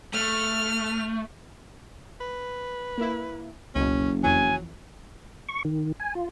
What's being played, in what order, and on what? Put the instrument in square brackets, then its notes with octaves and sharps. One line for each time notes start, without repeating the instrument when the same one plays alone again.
[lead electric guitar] A3 [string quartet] F6
[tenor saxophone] B4
[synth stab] A#3 E4
[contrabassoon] F#1 [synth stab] C#2 B2 [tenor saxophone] C#4
[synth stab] F2 E3 [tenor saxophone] F#3 [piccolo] G#5
[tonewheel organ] C#6
D#3
G#5
F4